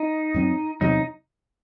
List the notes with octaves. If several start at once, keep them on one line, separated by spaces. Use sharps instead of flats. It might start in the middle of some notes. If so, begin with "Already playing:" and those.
Already playing: D#4
F#2 F#3 C4
E2 C3 F#3 D#4